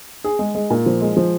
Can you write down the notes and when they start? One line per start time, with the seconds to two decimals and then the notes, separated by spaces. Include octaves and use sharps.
0.24 G#4
0.39 G#3
0.55 G#3
0.70 A#2
0.86 F3
1.01 G#3
1.17 F3